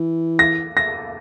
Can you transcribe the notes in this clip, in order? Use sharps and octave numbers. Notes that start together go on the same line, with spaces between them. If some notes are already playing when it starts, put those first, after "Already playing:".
Already playing: E3
A#6
A#6